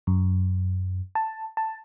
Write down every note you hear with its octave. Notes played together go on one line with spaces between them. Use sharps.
F#2
A5
A5